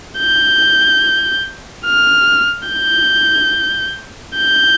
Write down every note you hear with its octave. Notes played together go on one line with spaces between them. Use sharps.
G6
F6
G6
G6